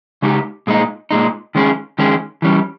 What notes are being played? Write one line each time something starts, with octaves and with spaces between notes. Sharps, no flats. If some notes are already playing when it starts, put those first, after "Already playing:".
C#3 G#3 D#4 G4
A#2 G#3 D#4
A#2 G#3 D#4
D#3 G#3 C#4 G#4
D#3 G#3 C#4 G#4
E3 G3 C#4